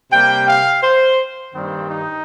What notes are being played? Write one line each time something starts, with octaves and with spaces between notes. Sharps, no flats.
C3 G3 A#3 G5
F5
C5
G2 D#3 G3 A#3 C4
D#4